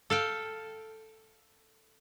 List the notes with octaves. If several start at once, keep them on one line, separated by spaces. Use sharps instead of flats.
A4 F5 G5